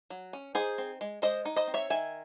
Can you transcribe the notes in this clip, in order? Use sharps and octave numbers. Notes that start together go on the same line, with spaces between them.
F#3
C#4
D#4 G#4 C5
C4
G#3
G#3 C5 D#5
D#4
C5 D#5
C4
C#5 E5
D#3 E5 G#5